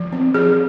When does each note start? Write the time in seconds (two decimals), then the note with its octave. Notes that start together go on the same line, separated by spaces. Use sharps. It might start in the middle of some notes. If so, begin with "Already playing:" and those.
Already playing: F3
0.13 C4
0.34 F3 G#4